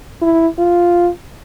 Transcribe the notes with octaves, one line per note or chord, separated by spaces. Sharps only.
E4
F4